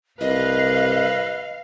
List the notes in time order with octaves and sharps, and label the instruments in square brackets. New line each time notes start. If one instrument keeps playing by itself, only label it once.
[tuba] C2 [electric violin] B4 [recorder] D#5 [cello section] F5